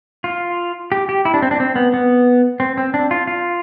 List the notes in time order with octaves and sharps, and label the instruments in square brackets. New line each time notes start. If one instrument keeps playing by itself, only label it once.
[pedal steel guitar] F4
G4
G4
E4
D4
C4
D4
C4
B3
B3
C4
C4
D4
F4
F4